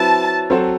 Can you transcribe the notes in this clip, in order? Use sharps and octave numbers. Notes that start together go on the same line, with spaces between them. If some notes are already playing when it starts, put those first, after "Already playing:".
Already playing: F#3 C4 E4 B4 A5
F#3 C4 F#4 A4 C5